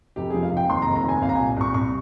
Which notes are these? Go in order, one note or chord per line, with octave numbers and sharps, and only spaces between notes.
F1 G4
F3 G#4
F5
F1 G5
D#2 C6
A#5
F1
A#5
D#2 G#5
C2 F5
A#5
A#2 G#5
C2 C#6
C2 C#6